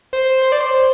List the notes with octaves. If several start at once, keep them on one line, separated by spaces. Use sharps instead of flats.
C5
C5
D5
C5